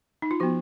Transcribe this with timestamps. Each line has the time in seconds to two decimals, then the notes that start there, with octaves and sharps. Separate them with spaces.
0.22 D#4
0.31 F4
0.40 F3 B3 F#4